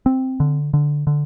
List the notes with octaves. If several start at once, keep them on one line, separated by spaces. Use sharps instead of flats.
C4
D3
D3
D3